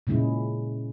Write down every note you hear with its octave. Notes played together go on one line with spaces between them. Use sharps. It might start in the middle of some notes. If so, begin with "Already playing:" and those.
A#2 C#3 G#3 E4